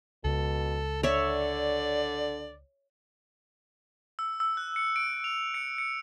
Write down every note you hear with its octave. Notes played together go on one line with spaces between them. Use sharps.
C#2 B2 A4
D3 C#5 D5 E5
E6
E6
F#6
C#7
D7
F7
C#7
C#7